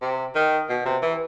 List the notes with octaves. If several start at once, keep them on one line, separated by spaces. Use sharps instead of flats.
C3
D#3
B2
C3
E3